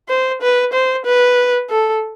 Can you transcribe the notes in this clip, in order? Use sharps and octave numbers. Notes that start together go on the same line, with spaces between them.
C5
B4
C5
B4
A4